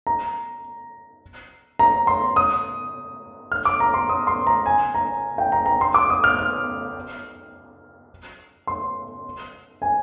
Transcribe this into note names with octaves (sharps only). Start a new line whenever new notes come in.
A#5
A#5
C6
D#6
F6
D6
A#5
C6
D#6
C6
A#5
G#5
A#5
G5
A#5
A#5
C6
D6
D#6
F6
F6
C6
G#5